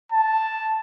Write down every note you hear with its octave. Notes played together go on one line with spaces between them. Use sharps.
A5